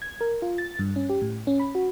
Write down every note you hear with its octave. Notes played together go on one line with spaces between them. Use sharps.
G#6
A#4
F4
A6
G2
C#4
G4
A2
C#4
B5
F#4